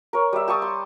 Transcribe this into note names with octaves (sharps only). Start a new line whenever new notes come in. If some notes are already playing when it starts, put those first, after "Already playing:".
A#4 C#5
G3 E5
G4 A5 C#6 D#6
C6